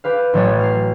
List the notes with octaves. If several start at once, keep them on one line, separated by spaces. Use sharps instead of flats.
G4 B4 F5
A1 F#3 A3 E4 C#5
F6 C7